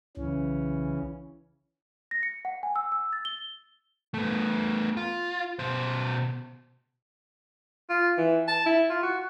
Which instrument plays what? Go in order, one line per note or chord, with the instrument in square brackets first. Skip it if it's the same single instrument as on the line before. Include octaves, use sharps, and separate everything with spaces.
[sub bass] B1 [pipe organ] C#3 E3 C#4
[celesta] A#6
C#7
F#5
G#5
E6
E6
A6
G7
[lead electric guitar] A3 B3
F4
B2 C5
[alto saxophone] F4
E3
A5
E4
F4
F#4